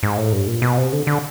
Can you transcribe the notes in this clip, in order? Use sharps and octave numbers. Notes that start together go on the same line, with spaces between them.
G#2
A2
G2
A#2
B2
C3
D3
D3